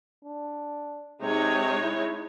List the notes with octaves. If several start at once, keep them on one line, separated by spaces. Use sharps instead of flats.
D4
C3 G#3 D#4 C#5
E4